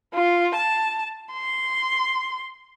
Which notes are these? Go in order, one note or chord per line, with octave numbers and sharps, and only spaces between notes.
F4
A5
C6